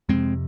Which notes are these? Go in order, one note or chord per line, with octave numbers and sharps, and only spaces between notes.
F2 C3 G#3 C4